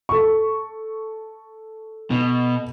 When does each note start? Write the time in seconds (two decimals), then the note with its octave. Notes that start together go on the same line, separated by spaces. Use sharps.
0.09 A4 C#6
2.11 B2